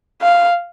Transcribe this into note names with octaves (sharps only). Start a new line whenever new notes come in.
F5